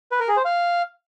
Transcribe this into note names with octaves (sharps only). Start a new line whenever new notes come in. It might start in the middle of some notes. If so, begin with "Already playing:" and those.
B4
A#4
G#4
C5
F5